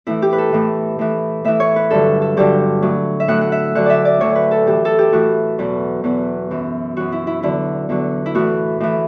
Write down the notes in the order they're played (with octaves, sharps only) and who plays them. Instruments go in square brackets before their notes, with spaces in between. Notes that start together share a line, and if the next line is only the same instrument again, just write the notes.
[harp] A2 E3 E4
G4
B4
A4
A2 E3
A2 E3
A2 E3 E5
C#5
B4
G2 D3 F#3 A4
A4
G2 D3 F#3 G4
A2 F#3
E5
A2 F#3 F#5
F#5
E5
D2 D3 F#3 F#5
D5 E5
D5
D2 D3 F#3 C#5
B4
A4
A2 E3 G4
A4
G4
A2 E3 F#4
E2 B2 F#3
E2 B2 F#3
F#2 E3
F#2 E3 F#4
E4
E4
E2 D3 F#3 E4
E2 D3 F#3
E4
A2 E3 F#4
A2 E3